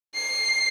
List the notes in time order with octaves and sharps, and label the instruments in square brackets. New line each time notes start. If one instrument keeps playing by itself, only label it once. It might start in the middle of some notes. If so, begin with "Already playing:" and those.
[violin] C7